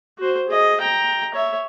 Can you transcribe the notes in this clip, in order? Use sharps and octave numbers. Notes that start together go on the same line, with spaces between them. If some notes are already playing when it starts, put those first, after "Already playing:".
F#4 C5
G#4 D#5
G5 A#5
C#5 E5